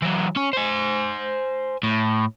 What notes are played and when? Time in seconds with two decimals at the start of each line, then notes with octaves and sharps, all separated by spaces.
0.02 E3 F#3
0.36 C#4 C#5
0.53 C5 G#5
1.83 A2